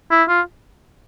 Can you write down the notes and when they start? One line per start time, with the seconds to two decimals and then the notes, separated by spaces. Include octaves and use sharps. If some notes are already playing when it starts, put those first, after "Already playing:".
0.11 E4
0.29 F4